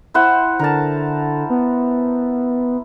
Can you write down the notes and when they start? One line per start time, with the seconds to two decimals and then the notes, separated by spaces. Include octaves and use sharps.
0.14 E4 C5 F#5
0.59 D3 A#4 A5
1.50 B3